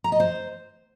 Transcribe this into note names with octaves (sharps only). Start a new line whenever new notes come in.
A#5
D#5
C5